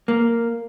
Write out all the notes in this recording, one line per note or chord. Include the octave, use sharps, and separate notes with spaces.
A#3